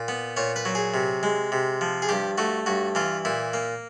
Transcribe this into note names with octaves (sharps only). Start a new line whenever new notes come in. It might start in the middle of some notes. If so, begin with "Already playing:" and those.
Already playing: A#2
B3
A#2 C#5
B4
F#3
G#4
C3
G#3
C3
F3
G#4
G2 G4
A3 F#4
G2 F#4
E3 F4
A#2 E4
A#3